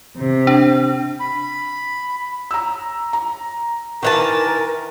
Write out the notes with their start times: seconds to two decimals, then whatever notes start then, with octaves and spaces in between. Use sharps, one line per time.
0.17 C3
0.47 D4
1.20 B5
2.51 A#5 E6
3.13 A#5
4.03 D#3 E3 A#4 A5